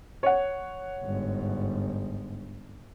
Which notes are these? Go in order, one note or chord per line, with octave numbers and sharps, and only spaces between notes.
C#5 F#5
G1 G#2